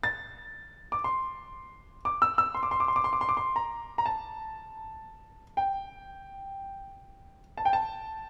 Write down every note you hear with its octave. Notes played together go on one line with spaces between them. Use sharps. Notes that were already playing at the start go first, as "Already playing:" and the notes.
A6
D6
C6
D6
E6
E6
C6
D6
C6
D6
C6
D6
C6
D6
C6
D6
C6
A#5
A#5
A5
G5
A5
G5
A5